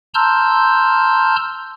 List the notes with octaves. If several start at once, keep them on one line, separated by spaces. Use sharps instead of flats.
A5 A#5 C6 E6 F6 G6